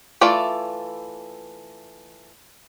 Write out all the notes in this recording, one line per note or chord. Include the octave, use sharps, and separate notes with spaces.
E3 A3 F4 D5